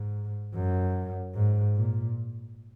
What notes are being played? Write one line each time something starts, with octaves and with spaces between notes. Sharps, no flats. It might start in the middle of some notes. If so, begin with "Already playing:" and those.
Already playing: G#2
F#2
G#2
A#2